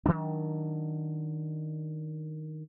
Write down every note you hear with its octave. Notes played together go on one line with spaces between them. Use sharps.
D#3 E3 F#3 D4